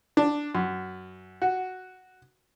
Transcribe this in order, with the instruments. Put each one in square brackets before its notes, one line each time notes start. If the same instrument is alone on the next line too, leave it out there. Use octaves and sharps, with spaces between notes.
[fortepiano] D4
F#2
F#4